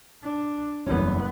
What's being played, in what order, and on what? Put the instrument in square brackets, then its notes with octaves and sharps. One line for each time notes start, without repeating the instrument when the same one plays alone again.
[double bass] D4
[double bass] F#1 B3 [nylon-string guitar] E2 G3 C#4